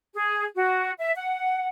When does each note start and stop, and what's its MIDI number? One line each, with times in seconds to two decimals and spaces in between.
0.14 0.44 68
0.55 0.93 66
0.99 1.12 76
1.15 1.68 78